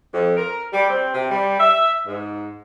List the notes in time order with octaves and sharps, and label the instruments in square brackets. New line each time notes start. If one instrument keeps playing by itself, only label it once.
[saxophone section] F2
A#4
G3
C4
C3
G3
E5
G#2